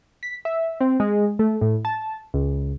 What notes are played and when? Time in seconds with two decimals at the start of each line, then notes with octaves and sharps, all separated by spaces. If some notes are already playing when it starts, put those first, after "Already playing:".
0.23 B6
0.45 E5
0.81 C4
1.00 G#3
1.39 A3
1.61 A2
1.85 A5
2.34 C#2